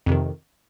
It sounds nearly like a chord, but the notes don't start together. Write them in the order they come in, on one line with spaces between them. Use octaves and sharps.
F2 C3 D#3